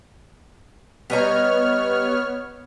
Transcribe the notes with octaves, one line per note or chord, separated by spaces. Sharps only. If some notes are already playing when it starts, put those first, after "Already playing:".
G3 B3 C#5 D#5 A#5 F6